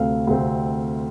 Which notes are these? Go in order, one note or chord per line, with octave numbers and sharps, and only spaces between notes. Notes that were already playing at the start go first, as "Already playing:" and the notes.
Already playing: D2 C3 A3 C4 F5
D2 C3 A3 C4